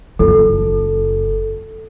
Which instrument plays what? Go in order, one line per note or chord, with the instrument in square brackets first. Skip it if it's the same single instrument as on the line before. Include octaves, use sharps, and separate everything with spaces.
[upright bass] F#1 F4 [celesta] A4